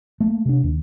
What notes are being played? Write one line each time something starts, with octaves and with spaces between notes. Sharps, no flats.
A3 A#3
C3 D4
D#2